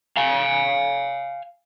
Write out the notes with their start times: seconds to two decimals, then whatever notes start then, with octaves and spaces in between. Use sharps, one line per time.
0.17 F5 G#5